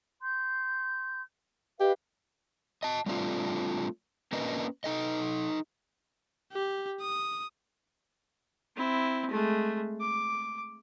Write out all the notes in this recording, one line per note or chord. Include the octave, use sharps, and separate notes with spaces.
C6 G6
G4 B4 D#5 F5
D#5 A5
G3 A3 C4 D4 F4
A#3 C#4 D4 A#4 B4 D#5
D#4 A4 D#5
G4
D#6
C4 E4
G#3 A3
D6